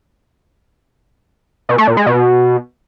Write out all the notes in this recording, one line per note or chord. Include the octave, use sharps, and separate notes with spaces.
B2
A3
A#2
G#3
B2